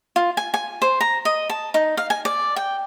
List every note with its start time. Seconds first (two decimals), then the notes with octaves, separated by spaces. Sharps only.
0.16 F4
0.37 G#5
0.54 G#5
0.82 C5
1.01 A#5
1.25 D#5
1.49 A5
1.74 D#4
1.97 F5
2.10 G#5
2.25 D5
2.56 G5